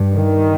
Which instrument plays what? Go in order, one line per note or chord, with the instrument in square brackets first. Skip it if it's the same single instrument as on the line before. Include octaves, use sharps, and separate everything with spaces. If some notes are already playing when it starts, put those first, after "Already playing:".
Already playing: [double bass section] G2
D#3